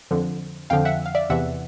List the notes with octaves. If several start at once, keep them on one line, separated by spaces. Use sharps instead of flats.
F2 D3 F3
F2 D3 F3 F5 G5
E5 F#5
F5
D5 E5
E2 C3 E3 E5 F#5